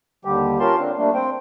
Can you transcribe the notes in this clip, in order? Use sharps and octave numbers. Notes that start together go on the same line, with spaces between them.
D#2 D3 G3 G4
C#4 F4 G4 A#4 A5 C6
D3 C4 D4
G3 A3 A#3 D4
C4 C5 G5